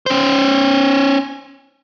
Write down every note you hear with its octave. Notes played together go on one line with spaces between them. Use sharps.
C#4 C5